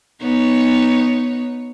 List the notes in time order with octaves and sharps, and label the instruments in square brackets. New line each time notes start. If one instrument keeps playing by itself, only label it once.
[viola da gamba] B3 D#4 C#5